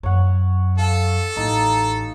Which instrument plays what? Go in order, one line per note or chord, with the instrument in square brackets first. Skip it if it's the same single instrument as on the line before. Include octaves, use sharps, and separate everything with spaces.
[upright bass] F#2 [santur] C#5 F#5
[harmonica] A4 [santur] F5
[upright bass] A1 [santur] D#4